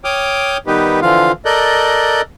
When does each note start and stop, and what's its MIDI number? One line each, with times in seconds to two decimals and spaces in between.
0.04 0.57 73
0.04 0.57 79
0.04 0.57 86
0.04 0.57 87
0.04 0.57 89
0.04 0.57 91
0.67 1.00 51
0.67 1.00 55
0.67 1.00 59
0.67 1.00 63
0.67 1.00 67
0.67 1.00 71
1.02 1.32 50
1.02 1.32 52
1.02 1.32 53
1.02 1.32 65
1.02 1.32 77
1.45 2.21 69
1.45 2.21 70
1.45 2.21 74
1.45 2.21 75
1.45 2.21 90
1.45 2.21 91